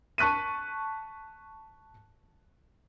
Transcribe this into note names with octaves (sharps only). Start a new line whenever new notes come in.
A5 C#6 F#6 B6 D#7